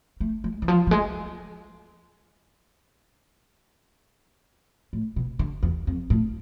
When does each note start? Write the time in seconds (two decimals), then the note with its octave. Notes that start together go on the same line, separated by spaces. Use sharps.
0.20 A3
0.44 G#3
0.62 E3
0.68 F3
0.87 F3
0.91 G#3
4.93 A2
5.16 B2
5.39 D3
5.63 E2
5.87 F2
6.10 A2